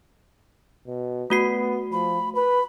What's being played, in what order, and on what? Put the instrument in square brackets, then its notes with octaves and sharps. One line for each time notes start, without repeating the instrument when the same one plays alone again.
[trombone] B2
[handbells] A3 F#4 C7 [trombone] B3
[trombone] F3 [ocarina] B5
[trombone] B4 [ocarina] B5